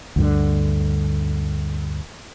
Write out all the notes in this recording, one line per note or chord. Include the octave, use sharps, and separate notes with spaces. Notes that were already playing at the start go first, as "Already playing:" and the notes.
D2 G2 D3